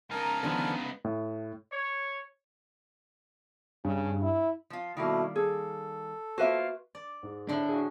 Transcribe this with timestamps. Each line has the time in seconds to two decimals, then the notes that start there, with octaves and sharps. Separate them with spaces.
0.11 C#2 D#4 A#4 G#5 A5 F6
0.43 D3 D#3 F3 B3
1.04 A2
1.72 C#5
3.84 G2 C#3
4.22 E4
4.70 F3 F4
4.97 B2 D#3 G3 A3 A#3 E4
5.36 G#4 A4
6.38 A#3 F4 F#4 B4 C5 E5
6.95 D5
7.23 G#2 G#3
7.49 A2 D3 D4 E4 G5
7.69 F#4 G#4